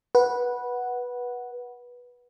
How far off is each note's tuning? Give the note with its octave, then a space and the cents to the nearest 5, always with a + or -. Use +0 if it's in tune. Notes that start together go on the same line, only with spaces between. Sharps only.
B4 -15 F#5 +0